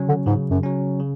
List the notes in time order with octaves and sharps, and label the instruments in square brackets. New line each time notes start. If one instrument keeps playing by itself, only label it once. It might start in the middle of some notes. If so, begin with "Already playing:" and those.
Already playing: [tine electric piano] C#3 F#3 C#4
[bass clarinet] D3
[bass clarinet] G#2 [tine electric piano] C#3
[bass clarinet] F#2
[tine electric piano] F#3 C#4
C#3